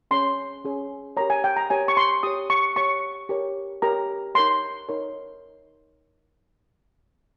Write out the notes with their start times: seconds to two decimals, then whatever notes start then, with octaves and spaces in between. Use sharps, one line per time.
0.11 C#4 G#4 C#5 C6
0.64 C#4 G#4 C#5
1.17 G4 A#4 C#5 A#5
1.30 G#5
1.44 G5
1.56 A#5
1.70 G4 A#4 C#5 G#5
1.88 C#6
1.97 C6
2.23 G4 C#5 D#6
2.50 C#6
2.76 G4 C#5 C#6
3.29 G4 A#4 C#5
3.82 G4 A#4 C#5 A#5
4.35 D#4 A#4 C#5 C6
4.89 D#4 A#4 C#5